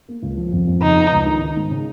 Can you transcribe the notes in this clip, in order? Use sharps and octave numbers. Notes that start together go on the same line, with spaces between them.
A#3
C#2
F3
F2
F2
C#3 D#4
B3
C#2
D#3
D#4
G#2
C#3